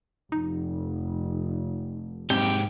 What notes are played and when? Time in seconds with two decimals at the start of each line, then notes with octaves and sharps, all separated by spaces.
0.32 F1 D#4
2.30 G#2 C4 G4 G5